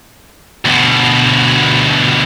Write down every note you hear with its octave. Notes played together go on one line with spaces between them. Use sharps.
D2 B2